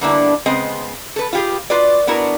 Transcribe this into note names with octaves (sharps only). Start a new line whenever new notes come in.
D3 G3 A#3 B3 D4 E4
C#3 G#3 B3 C4 D#5
A4 B4
F4 G4 G#4
F4 F#4 B4 D5
B3 D4 E4 F#4 A#4